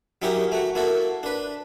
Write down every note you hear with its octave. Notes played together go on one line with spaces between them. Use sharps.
F#3 C#4 D#4 E4 G4 A#4
A3 F#4
A#3 E4 F#4 A4
D4 B4